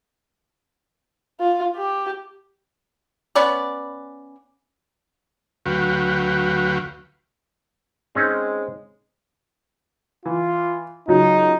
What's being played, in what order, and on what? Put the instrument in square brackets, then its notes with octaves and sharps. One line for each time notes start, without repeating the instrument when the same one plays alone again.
[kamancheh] F4
G4
[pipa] B3 C#4 B4 D5
[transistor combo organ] D2 F#3 F#4 B4 F5 G5
[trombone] G#3 [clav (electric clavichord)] C4 C#4 D#4
[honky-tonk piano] E3 [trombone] F4
[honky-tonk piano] C#2 F#3 [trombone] D#4